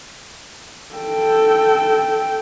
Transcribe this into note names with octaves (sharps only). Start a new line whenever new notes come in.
A4 G5